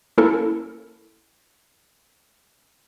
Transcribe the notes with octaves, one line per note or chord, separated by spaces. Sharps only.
A#3 C#4 E4 A4 A#4